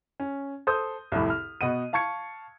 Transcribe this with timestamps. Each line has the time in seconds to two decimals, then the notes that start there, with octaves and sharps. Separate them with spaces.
0.20 C#4
0.67 A4 C5 C6 D#6 G6
1.12 C2 F2 A2
1.30 F6
1.61 B2 D#5 F#5 D#7
1.93 F5 A5 C#6 G#6 C#7